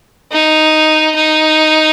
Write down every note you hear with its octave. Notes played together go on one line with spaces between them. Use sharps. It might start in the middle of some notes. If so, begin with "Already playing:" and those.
D#4
D#4